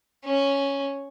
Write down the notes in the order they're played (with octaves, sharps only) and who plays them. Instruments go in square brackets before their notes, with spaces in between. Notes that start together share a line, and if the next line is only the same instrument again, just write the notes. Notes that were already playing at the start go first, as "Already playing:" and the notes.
[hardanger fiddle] C#4